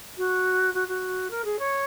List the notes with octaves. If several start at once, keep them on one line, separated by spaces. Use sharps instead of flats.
F#4
F#4
F#4
A#4
G#4
C#5